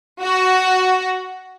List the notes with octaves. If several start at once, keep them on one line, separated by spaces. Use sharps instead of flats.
F#4